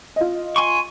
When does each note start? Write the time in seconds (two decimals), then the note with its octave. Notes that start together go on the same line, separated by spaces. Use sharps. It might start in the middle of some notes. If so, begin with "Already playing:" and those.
0.16 F4 D#5
0.56 G#5 C6 C#6